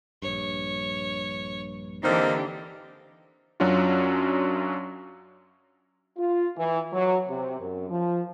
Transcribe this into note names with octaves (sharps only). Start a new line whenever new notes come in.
A#1 G2 C#5
D3 E3 A#3 C4 D4 D#4 G4
F#2 F#3 C#4 D4 F4 F#4
F4
E3
F#3
C3
F#2
F3